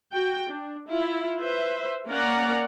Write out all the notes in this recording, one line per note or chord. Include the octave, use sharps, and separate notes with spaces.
F#4 G5
D4
E4 F4
B4 C5 E5
A#3 C#4 A#4 D5 F#5 A#5